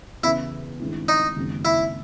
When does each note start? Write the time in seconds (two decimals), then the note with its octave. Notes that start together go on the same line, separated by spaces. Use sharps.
0.23 E2 C#3 E3 E4
0.80 G2 D#3 G#3 C4 E4
1.08 D#4
1.36 F#1 F#2 D#3 G#3 C4
1.65 E4